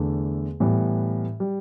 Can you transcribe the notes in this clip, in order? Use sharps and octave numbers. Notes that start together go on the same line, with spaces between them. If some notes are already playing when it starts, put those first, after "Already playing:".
Already playing: E2 D3 A3
A2 E3 G3 B3
G3